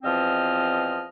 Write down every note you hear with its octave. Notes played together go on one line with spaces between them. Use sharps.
E2 B2 F3 C4 D#5 F6